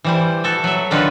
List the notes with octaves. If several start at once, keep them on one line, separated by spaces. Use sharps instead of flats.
E3 G3 C5
F#4 A4 E5
F#3 E5
D3 D#3 F#3 D4 F4 B4